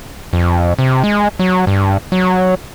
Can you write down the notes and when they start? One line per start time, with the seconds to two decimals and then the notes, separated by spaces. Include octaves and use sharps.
0.33 F2
0.79 C3
1.04 G#3
1.39 F#3
1.67 G2
2.12 F#3